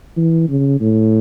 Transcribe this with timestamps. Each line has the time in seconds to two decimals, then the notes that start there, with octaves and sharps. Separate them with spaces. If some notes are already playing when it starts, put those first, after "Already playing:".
0.17 E3
0.49 C#3
0.81 A2